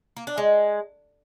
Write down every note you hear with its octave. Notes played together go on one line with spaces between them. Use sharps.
A#3
D4
G#3